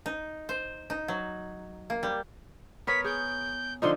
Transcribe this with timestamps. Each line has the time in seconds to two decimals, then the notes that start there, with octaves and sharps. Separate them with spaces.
0.06 D#4
0.49 C5
0.90 D#4
1.08 F#3
1.90 A#3
2.03 G3
2.87 B3 A#4 C#5 B6
3.04 G#4 G6
3.82 D3 F3 D#4 C6